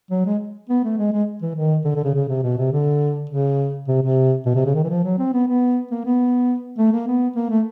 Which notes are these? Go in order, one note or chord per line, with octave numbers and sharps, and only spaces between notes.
F#3
G#3
B3
A3
G#3
G#3
E3
D#3
D3
D3
C#3
C#3
C3
B2
C3
D3
C#3
C3
C3
B2
C3
C#3
D#3
E3
F3
F#3
C4
B3
B3
A#3
B3
A3
A#3
B3
A#3
A3